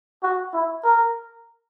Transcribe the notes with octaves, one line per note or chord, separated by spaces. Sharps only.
F#4
E4
A#4